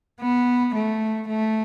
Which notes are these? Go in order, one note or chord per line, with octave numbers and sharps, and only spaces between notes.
B3
A3
A3